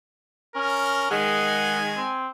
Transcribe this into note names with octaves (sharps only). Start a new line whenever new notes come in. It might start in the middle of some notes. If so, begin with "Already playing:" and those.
C#4 A#4
D#3 G#3 F#5 G#5
C4